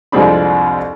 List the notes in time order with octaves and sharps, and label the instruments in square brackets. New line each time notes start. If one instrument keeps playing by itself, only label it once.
[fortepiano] C2 F2 G#3 C4 D4 B5